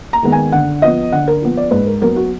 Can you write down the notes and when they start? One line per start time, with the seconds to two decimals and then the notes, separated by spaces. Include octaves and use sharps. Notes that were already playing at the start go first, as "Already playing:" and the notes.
0.13 A#5
0.23 D#3 G#3 B3
0.32 G#5
0.52 D3 F#5
0.82 F3 B3 D#5
1.12 D3 F#5
1.28 A#4
1.41 F3 B3
1.57 D5
1.71 G#2 B4
1.87 A#4
2.02 F#3 B3 A#4
2.16 F#4